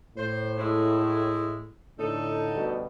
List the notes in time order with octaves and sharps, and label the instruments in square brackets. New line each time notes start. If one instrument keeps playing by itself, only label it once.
[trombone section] A2 [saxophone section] C5
[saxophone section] G#3 A3 E4
[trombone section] A2 D3 [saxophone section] D#4 A4
[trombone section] D2 B2 G3